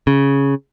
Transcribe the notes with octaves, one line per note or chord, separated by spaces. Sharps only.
C#3